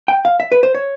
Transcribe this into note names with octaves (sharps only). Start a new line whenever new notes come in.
G5
F5
E5
B4
C5
C#5